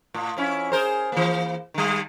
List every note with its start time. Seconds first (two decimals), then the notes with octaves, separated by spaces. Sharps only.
0.14 A2
0.37 F2 C#4 E4
0.72 G#4 A#4 C5
1.12 E3 A#3
1.74 D#3 G3